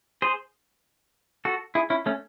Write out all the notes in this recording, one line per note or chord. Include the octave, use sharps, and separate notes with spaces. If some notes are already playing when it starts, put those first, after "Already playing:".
G#4 C5
F#4 A4
E4 G#4
C#4 E4
A3 C#4